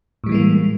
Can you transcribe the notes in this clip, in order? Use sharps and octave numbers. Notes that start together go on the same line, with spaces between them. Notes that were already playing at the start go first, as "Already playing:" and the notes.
A2 E3 G3 G#3 A#3